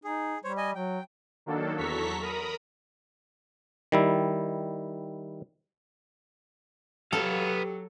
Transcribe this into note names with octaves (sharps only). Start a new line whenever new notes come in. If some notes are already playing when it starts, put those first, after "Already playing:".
D#4 G#4
G3 C5 C#5
D#5 G#5
F#3 G5
D#3 F#3 A#3 D4 A4
E2 F#3 A4 A#5 C#6 B6
A#4 A#5 B5 D#6
D#3 G3 E4
F#3 B3 G4 A4 F5